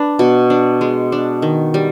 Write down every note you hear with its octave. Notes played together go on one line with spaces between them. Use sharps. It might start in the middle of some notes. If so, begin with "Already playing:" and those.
Already playing: D4 B4
B2
D4
G#3
D4
D#3
G3